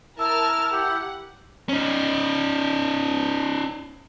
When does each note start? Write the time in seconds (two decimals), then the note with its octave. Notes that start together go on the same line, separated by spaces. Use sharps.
0.19 E4 A#4 A5 E6 F6
0.73 G4 F#5
1.69 C#4 D#4